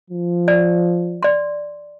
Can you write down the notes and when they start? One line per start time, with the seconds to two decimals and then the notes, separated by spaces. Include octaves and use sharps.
0.10 F3
0.48 D5
1.23 D5 C6